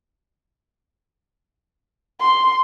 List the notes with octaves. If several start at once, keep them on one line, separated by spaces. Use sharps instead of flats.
C6